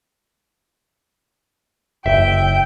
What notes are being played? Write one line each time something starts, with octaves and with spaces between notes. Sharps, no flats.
F#1 E5 G5